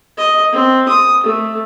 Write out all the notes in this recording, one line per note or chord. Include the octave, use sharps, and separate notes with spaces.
D#5
C4
D#6
A3